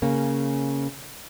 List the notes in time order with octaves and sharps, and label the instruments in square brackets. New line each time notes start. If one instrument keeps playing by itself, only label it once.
[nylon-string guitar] C#3 A#3 C#4